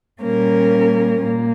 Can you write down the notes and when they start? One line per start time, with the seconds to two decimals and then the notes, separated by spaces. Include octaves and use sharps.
0.22 A#2 G3 A#3 C#4 A#4
1.24 A#2 A#3